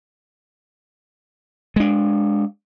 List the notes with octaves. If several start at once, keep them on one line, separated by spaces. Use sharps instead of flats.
G#3 D4